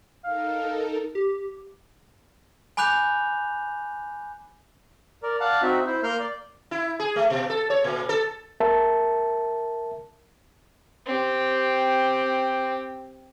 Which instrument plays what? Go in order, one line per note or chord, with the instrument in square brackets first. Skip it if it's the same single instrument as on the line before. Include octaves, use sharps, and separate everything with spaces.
[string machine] D#4 A4 A#4 [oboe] F5
[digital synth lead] G4
[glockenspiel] G#5 B5 D6 F#6 G6 F7
[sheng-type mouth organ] A#4 D5
D5 F5 F#5 A5
C4 D#4 F#4 E5
E4 C5
A#3 A#4 C6 F6 G6
D5
[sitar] E4
G#4
A3
B2
A4
C#5
A#2
A4
[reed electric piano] A#4 E5 A5
[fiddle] C4 G4